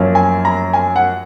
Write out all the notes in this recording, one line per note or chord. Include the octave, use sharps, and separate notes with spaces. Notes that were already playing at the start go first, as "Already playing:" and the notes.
Already playing: F#2 F3 A#3 C#4
G#5
A#5
G#5
F#5